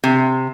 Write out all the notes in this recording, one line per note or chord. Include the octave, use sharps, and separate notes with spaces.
C3